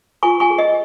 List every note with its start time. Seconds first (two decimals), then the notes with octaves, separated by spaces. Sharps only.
0.23 F4 G#5 C#6
0.40 G#5 C#6
0.50 G#4
0.58 D#5